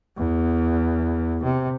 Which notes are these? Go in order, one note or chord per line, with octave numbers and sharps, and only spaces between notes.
E2
C3